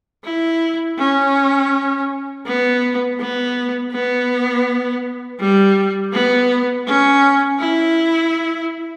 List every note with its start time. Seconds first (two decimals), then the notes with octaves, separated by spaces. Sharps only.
0.24 E4
0.98 C#4
2.46 B3
3.19 B3
3.92 B3
5.40 G3
6.13 B3
6.87 C#4
7.59 E4